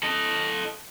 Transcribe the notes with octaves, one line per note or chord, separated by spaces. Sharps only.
A4 D#5